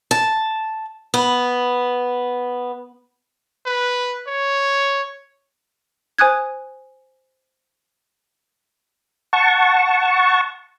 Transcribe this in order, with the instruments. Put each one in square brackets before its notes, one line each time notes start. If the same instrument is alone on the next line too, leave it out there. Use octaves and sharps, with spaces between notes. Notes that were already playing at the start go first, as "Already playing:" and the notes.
[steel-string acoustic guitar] A5
B3
[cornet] B4
C#5
[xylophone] C5 G#5 D#6 F#6 G#6
[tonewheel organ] F#5 A5 C#6